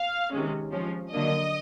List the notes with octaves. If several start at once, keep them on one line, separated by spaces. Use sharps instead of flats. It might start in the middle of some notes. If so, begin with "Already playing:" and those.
Already playing: F5
C3 D#3 G#3 C#4
F3 G#3 C#4
D3 F#3 A#3 D4 D#5